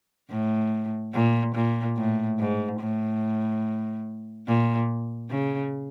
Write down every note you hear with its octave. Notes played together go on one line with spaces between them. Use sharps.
A2
A#2
A#2
A2
G#2
A2
A#2
C#3